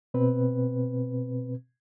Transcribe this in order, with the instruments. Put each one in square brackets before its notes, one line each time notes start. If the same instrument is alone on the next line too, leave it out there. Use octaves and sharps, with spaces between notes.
[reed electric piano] B2 C4 B4